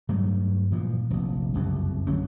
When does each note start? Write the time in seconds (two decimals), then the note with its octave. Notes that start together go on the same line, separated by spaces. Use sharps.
0.09 G2 F#3 A3
0.72 A#2 E3 F3
1.10 F1 A#1
1.54 F#1 C2 F2
2.07 A1 D3 F#3 C#4